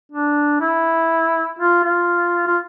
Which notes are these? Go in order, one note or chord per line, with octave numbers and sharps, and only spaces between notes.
D4
E4
F4
F4
F4